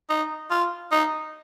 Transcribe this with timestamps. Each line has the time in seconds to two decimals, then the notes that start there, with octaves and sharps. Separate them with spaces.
0.10 D#4
0.51 F4
0.91 D#4